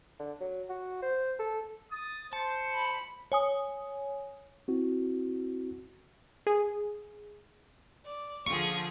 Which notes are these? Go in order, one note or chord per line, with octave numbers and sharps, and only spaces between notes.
D3
F#3
F#4
C5
A4
D#6 A6
C5 A5 C#7
B5
C#5 G#5 D#6
C4 E4 F#4
G#4
D5
D3 F3 F4 G#4 C#6